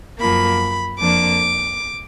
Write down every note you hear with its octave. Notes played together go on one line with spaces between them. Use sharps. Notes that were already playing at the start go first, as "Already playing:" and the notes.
F#2 F3 A#3 B5
F2 F3 A#3 D4 D6